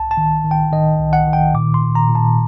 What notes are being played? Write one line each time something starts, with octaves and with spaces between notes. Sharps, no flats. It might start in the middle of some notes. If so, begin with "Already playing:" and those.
Already playing: C2 A5
A5
D#3
D#3
G5
D#3 D#5
C2
F#5
D#3
G5
A#2 D6
C6
A#2
A#5
A#2
A5